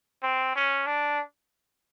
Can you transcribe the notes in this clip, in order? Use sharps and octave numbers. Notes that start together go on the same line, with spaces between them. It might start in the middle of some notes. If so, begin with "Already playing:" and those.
C4
C#4
D4